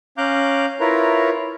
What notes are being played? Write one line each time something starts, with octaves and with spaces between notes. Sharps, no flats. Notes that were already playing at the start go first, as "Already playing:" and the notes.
C#4 F5 A#5 D6 F#6 G6
E4 F4 A#4 B4 C#5 A#5